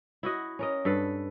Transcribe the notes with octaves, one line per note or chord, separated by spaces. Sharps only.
E4 F#4 D#5
C#4 A#4 D#5
G2 A4 B4